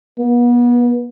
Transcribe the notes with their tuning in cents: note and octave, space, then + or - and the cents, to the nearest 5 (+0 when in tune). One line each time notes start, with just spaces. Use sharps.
B3 -35